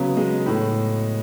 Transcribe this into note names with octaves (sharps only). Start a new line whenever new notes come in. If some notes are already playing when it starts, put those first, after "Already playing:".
Already playing: C#3 F#3 B3 B4
G#3
A2